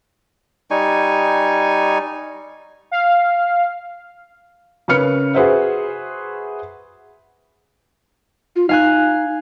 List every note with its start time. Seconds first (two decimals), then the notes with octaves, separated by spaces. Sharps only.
0.71 G3 D#4 G#5 C#6
2.91 F5
4.88 C#3 C#4 A#4 B4 F6 C#7
5.34 F#4 G#4 B4 C5 E5
8.56 F4
8.69 D#4 F5 G#5 F#6